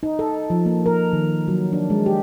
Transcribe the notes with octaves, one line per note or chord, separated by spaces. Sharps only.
D#4
A4
F3
A#3
A#4
D#3
F#3
D4
G#3
G4